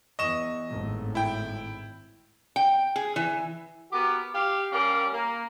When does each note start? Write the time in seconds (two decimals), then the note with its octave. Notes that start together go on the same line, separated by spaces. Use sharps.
0.19 E2 D#5 C#6 E7
0.69 G#1 A2
1.15 E4 G5
2.56 G5
2.96 G#4
3.16 E3
3.92 B3 F#4 G4 A#4
4.34 G4 F5
4.72 G3 C#4 G4 A#4 F5
5.13 A#3